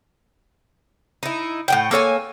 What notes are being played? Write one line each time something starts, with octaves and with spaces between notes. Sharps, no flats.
D#4 E4
A2 F#5 G5
A#3 A4 C#5 G#5